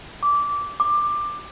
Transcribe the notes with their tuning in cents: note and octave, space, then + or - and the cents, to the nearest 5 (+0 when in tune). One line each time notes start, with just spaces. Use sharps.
D6 -15
D6 +15